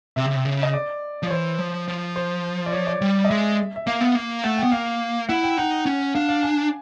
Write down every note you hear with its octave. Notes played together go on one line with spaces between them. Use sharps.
C3 E5
C#3
C3
C#3
D#5
D5
F3
C#5
E3 C5
F3
F3
C5
D5
C#5
D5
G3
D#5
G#3 E5
E5
A#3 F5
B3
A#3
A3 F#5
G5
B3
A#3 F5
E4 F#5
G5
D#4 F#5
C#4
D4 F5
F5
G#5